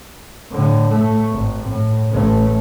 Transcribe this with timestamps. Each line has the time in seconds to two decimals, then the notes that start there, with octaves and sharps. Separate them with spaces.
0.52 A2 D3
0.89 A2 A3
1.33 G#1
1.69 A2
2.11 A1 A3